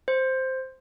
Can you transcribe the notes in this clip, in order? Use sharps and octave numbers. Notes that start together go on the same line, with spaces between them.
C5